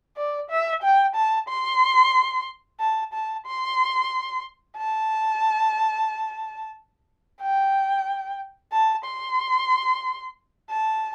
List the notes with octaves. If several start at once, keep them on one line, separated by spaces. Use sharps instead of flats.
D5
E5
G5
A5
C6
A5
A5
C6
A5
G5
A5
C6
A5